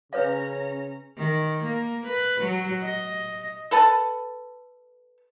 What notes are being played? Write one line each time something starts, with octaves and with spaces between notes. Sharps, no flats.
C#3 C#4 B4 C#5 F5 A#5
D#3
A#3
B4
F#3
D#5
A4 B4 A5